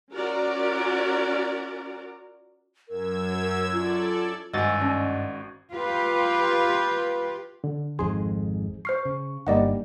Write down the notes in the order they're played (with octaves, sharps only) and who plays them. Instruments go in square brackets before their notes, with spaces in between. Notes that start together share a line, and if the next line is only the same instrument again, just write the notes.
[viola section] C#4 F4 F#4 A#4 D5
[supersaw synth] F#2 E6 G#6 [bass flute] A#4
[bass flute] A#4
[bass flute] F4 [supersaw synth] A4 D5
[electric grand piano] G#1 F#4 D#5 [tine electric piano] G2 A6 [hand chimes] G#5 E6
[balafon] C#4 [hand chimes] D5
[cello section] F4 G4 B4
[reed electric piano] D3
[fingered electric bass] G#1 F2 G#2 [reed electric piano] G#4 [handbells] C6
[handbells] C5 F6 C7 [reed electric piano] C#6
[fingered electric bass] C#3
[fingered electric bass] G1 G2 [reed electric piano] G3 A#3 D#4 [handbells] D5 D#5 F#5